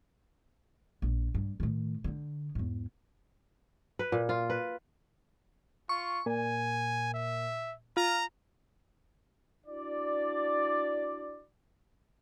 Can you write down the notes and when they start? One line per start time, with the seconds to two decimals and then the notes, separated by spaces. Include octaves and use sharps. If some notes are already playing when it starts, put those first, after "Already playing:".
1.02 A#1
1.34 G2
1.60 A2 D#3
2.04 D3 D#4
2.55 E2 G#2
3.99 B4
4.12 A#2
4.29 F4
4.50 B4
5.89 F4 C#6
6.26 A#2 G#5
7.14 E5
7.97 F4 A#5
9.66 D4 E4 F#4 D5